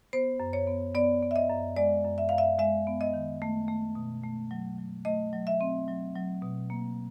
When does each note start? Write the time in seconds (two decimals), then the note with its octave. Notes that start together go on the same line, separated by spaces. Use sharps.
0.13 B3 C5
0.40 F#2
0.53 C#5
0.67 B3
0.94 B3 D5
1.22 B3
1.31 E5
1.36 D#5
1.50 F#2
1.77 G#3 D5
2.04 F#2
2.18 E5
2.29 F#2 F5
2.38 E5
2.59 G#3 E5
2.87 B3
3.01 D#5
3.14 D#3
3.42 A3
3.68 A3
3.95 B2
4.23 A3
4.51 F#3
4.78 F#3
5.05 A3 D#5
5.33 F#3
5.47 E5
5.61 C4
5.88 F#3
6.16 F#3
6.42 B2
6.70 A#3